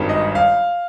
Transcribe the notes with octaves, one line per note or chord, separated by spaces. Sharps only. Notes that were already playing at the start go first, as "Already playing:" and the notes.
Already playing: G#1 G2 D#3 G3
D#5
F5